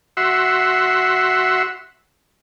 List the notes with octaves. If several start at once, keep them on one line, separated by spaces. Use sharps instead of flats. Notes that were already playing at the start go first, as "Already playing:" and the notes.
F#4 E5 F#5 C6 E6